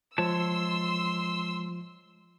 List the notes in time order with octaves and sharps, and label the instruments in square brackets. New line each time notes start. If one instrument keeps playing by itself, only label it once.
[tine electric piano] F3 [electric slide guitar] G#3 C#5 A5 [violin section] C6 E6